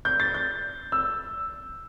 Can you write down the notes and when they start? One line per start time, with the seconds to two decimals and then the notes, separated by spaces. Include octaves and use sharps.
0.05 G6
0.20 A6
0.34 G6
0.92 E6